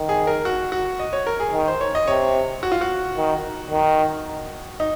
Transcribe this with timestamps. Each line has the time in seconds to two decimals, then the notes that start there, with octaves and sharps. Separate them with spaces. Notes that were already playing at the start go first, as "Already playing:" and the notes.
Already playing: D#3
0.09 G#4
0.27 A#4
0.45 F#4
0.72 F#4
1.00 D#5
1.13 C#5
1.27 A#4
1.40 G#4
1.53 D#3
1.68 C5
1.81 C#5
1.95 D#5
2.08 C3 C#5
2.63 F#4
2.72 F4
2.81 F#4
3.17 D#3
3.70 D#3
4.80 D#4